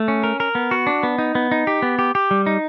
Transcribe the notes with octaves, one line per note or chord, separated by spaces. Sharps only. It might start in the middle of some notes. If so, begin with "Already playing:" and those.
Already playing: A3
C#4
A#4
A#4
B3
F#4
D4
B3
D#4
B3
D#4
G4
B3
G4
G4
G3
D#4